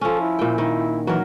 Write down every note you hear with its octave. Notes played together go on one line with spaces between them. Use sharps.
F3 C#4 A4
E4
A#2 G5
D#3
E3 F#3 A#4